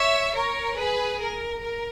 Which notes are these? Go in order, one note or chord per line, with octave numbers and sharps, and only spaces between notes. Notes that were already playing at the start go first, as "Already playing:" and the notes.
Already playing: C#5 E5
A#4 C#5
G#4 B4
A#4
A#4